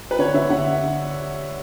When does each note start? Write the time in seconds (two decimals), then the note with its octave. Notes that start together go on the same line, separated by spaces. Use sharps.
0.11 B4
0.19 D3 C#5
0.34 D3 E5
0.50 D3 F#5